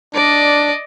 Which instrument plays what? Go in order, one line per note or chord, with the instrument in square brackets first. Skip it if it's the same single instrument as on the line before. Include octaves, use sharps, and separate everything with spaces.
[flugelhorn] D4 [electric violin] D5 D#5